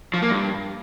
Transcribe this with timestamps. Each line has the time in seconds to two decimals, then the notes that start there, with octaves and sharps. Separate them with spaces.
0.14 F3
0.22 A#3
0.31 G2